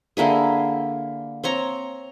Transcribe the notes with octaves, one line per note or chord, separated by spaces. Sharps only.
D3 A#3 E4 G#4
C4 C#5 A#5